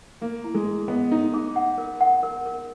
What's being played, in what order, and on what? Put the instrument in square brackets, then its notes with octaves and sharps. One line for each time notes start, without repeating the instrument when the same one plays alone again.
[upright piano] A#3 [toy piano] G#4
[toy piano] E4
[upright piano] G#3
[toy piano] G#4
[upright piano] B3 [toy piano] D#5
[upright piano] D#4 [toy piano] D#5
[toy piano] G#4
F#5
A#4
F#5
A#4
A#4